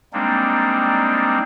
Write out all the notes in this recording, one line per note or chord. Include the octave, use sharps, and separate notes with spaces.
G3 G#3 A#3 C4 D4 D#4